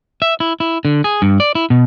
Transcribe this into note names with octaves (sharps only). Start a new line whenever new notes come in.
E5
E4
E4
D3
G#4
G2
D5
E4
B2